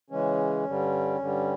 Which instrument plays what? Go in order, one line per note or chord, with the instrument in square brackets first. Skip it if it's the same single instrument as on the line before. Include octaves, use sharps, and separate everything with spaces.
[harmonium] C#3 E3 G#3 C#4
G2 D3 G3
G2 D3 G3